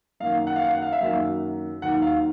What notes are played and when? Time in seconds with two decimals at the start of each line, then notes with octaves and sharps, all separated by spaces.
0.20 F#2 D#3 F#3 A#3 F5
0.47 F#5
0.56 F5
0.64 F#5
0.75 F#5
0.82 F5
0.92 E5
1.01 F#2 D#3 F#3 A#3 F5
1.82 D#2 D#3 F#3 F#5
2.02 F5